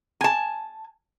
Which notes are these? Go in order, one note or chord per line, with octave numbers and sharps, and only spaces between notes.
G#5 A5